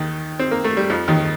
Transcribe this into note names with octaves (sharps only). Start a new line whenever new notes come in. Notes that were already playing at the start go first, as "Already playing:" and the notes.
Already playing: D#2 D#3
C4
A#3
A3
G3
F2 F3
D#2 D#3